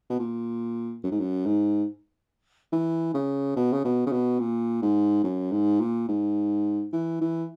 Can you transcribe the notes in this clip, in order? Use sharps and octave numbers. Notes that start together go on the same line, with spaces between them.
B2
A#2
F#2
G#2
F#2
G#2
E3
C#3
B2
C#3
B2
C#3
B2
A#2
G#2
F#2
G#2
A#2
G#2
E3
E3